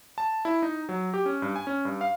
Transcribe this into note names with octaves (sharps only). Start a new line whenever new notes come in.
A5
E4
D#4
F#3
G4
C#4
G2
G#5
C#4
G2
F5